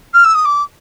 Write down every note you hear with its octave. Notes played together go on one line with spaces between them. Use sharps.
F6
E6
D#6
D6